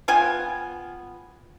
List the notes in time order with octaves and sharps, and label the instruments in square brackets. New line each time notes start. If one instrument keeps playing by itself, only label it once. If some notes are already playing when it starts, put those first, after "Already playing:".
[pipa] B3 F4 G5 G#5